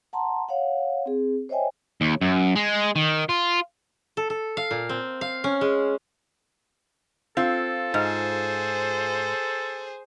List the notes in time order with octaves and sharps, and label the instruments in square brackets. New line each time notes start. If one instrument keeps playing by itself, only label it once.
[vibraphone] F#5 A5 A#5 C6
C#5 F5 F#5
C4 G#4
C5 C#5 D#5 E5 G5 G#5
[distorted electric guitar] D#2
F#2
G#3
D#3
F4
[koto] A4
A4
F5
A#2
C4
F5
C#4
G#3
[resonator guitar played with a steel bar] C4 [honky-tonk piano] F4 [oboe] A4
[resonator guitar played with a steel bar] G#2 [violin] G#4 C5